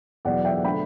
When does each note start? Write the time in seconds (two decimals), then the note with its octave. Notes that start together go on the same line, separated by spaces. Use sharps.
0.25 E2 B2 F#3 D5 F#5
0.45 E5 G5
0.64 D3 A3 G5 B5